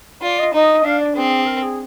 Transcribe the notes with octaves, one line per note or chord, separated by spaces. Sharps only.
F4 D5
D#5
D#4 D#5
D4 F5
D5
C4 G#4
A#4
G#4